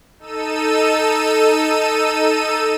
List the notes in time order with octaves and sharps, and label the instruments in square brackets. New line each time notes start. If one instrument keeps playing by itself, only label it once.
[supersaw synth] D#4 A4 E6 D#7